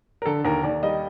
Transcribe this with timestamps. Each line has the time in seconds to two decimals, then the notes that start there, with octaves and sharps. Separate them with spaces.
0.22 A#4
0.26 D3 A4
0.45 D#2 A#4
0.63 D#2 D5
0.83 G3 D#5